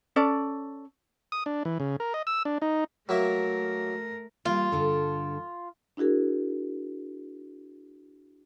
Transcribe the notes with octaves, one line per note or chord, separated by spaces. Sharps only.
C#4 A4 D5
D#6
D4
E3
C#3
A#4
D#5
E6
D4
D#4
F#3 A3 A#3 A#4 E5
G3 A#3 F4
G2 D3 A4
D4 E4 F#4 G#4 A#4